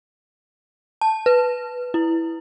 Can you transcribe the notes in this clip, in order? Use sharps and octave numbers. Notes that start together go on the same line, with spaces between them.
A5
B4
E4